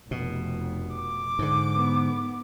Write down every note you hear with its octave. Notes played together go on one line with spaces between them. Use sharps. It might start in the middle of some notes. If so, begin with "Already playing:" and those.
F1 B2
D6
G#2 D3
B3